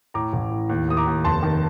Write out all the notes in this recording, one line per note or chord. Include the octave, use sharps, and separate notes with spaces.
A2 A#5 D6
A1
A2
D#2
D#2 D#6
A#5 D6
D#2
F1 A5 C6
D#3